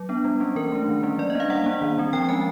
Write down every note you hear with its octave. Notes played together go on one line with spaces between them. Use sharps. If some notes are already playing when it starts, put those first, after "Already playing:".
Already playing: F#3
B3 D4
G3
A#3 C#4
E3 A#4
A3 D4
D#3
G3 A#3 C#4
F#3 D5
D#5
A#3 D4 F5
G3 F#5
A#3 D4
D#3
G3 C4
F3 G5
G#3 C#4 G#5